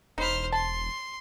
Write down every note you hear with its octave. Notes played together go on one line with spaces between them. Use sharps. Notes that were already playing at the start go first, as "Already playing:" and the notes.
E1 D#4 C5 B5 F6
A5 C6